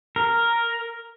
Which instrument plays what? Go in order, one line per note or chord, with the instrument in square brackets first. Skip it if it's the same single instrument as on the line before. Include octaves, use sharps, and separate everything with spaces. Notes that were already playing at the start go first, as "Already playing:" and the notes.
[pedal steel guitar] A#4